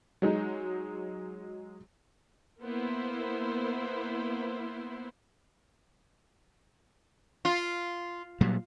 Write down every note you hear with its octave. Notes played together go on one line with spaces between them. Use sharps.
F#3 G#3 D#4
A#3 B3 E4 C5
F4
A#2 F#3 G3